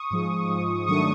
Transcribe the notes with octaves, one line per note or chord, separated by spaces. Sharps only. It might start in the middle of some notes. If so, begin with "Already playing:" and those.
Already playing: C#6 D#6
G#2 F3 G#3
G#2 F3 G#3
G#2 D#3 F#3 A3 D4 C#6 D#6